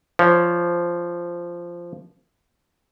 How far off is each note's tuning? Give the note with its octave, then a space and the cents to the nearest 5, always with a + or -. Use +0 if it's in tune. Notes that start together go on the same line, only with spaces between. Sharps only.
F3 -10 C#5 +15